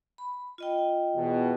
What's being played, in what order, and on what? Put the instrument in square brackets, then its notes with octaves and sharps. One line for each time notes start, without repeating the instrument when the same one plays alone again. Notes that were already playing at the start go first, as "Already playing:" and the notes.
[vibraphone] B5
F4 D#5 G5
[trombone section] E2 B2